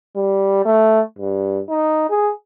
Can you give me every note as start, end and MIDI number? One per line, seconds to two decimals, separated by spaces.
0.16 0.61 55
0.65 1.00 57
1.19 1.60 43
1.69 2.08 63
2.10 2.32 68